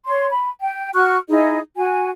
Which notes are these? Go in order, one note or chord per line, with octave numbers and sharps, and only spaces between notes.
C#5 C6
B5
G5
F#4 C#6 F6 F#6
D#4 E4 G#4 D#5
F#4 G#5